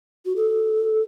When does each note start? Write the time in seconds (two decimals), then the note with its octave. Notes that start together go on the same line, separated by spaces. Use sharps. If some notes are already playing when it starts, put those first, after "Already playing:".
0.26 F#4
0.36 A4